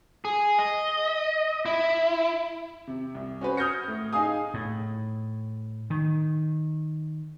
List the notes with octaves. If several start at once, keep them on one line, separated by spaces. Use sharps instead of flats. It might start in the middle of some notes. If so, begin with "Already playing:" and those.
G#4
D#5
E4
C3
C2
C#4 F#4 B4 C5
D#6 F6 G6 G#6 A#6 C#7
A2
D#4 G#4 F5 G#5 D#6
A2
D#3